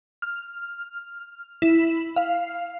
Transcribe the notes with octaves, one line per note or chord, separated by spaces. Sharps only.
F6
E4
F5